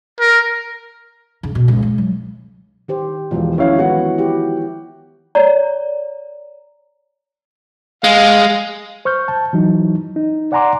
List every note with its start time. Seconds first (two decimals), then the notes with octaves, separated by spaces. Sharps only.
0.20 A#4
1.43 C#3
1.55 B2
1.68 C#2
1.83 G#3
1.98 F#3
2.88 D#3 G4 C5
3.31 E1 E2 F3 G#3 F4
3.58 D#3 C#4 E4 C#5 F5
3.79 E3 B3 E4 F#4 F#5
4.18 E4 G4
5.35 C#5 D5 A#5
8.04 G#3 F5
9.05 C5 C#6 F6 G6
9.28 A5
9.53 E3 F#3 D#4
10.16 D#4
10.52 D5 F#5 G#5 A#5 C6 D6